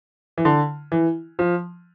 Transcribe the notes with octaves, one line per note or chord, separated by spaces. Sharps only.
E3
D3
E3
F3